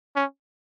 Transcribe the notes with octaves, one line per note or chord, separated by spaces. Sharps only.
C#4